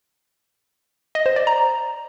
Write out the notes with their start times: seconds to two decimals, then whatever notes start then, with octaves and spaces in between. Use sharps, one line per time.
1.15 D#5
1.26 C5
1.36 D5
1.47 A#5